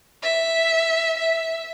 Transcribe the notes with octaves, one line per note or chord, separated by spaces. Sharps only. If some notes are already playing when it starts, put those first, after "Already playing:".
E5
E5